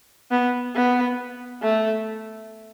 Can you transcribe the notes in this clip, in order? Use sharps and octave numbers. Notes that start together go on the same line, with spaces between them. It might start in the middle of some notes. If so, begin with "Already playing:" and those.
B3
B3
A3